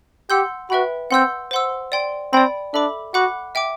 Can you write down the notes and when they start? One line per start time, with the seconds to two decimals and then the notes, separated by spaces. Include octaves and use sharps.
0.30 G4 F#5 C6 E6 G6
0.70 F#4 B4 E5 G5 B5
1.11 C4 F#5 C6 E6 G6
1.51 C5 F#5 C6 E6
1.92 D5 G5 C6
2.33 C4 D5 G5 B5
2.74 D4 A4 E5 B5 D6
3.14 F#4 F#5 B5 D6 F#6
3.55 E5 G5 D6